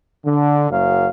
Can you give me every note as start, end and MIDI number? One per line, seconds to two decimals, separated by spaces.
0.25 0.66 50
0.70 1.09 30
0.70 1.09 42
0.70 1.09 54
0.70 1.09 77